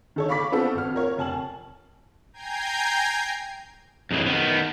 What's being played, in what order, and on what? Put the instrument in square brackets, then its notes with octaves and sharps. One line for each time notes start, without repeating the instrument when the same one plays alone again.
[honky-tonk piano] D#3 A4 C#5
F5 B5 C#6 D6 B6
B3 C4 F4 A4
G#1 F6
F4 A#4 C#5
F1 G#5 A5 F#7
[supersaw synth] G5 G#5 A#5 G6 G#6 C7
[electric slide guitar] F2 C#3 E3
D#3 B3